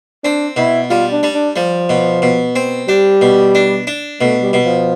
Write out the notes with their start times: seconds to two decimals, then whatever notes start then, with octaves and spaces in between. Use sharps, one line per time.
0.24 C4 D4
0.56 B2 E4
0.90 G3 F4
1.12 D4
1.23 G3
1.35 D4
1.56 F3 G3
1.89 B2
2.22 B2
2.56 C4
2.88 G3 D4
3.21 B2
3.55 D4
3.87 D4
4.21 B2 A3
4.42 G3
4.53 B2
4.65 F3